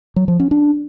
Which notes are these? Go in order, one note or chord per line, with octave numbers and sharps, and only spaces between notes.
F#3
F3
C#4
D4